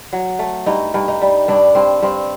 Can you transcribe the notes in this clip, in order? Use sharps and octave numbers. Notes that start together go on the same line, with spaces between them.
F#3
A3
G2 D#4
G2
D#4
G3
G2 D4
G2 C4
G2 C4